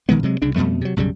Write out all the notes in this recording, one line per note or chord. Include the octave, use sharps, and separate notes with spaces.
A#1 D#3 G#3 B3
C3 F#3 G#3
C2 C#3 D4
F2 B2 G3 A3
C3 F#3
B1 F#2 C#3 G3